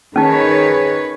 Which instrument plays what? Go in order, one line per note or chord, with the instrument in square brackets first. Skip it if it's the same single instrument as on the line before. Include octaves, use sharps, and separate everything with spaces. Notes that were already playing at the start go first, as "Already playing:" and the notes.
[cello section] D#3 B4 C#5 [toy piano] C#4 D#4 [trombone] G#4